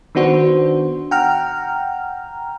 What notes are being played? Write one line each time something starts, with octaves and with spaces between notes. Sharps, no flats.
D#3 B3 D4 F#4 C5
F#5 G5 A#5 F6